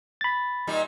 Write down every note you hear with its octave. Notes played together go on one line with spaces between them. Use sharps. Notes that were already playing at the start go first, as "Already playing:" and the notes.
B5 A6
A#2 G3 D#4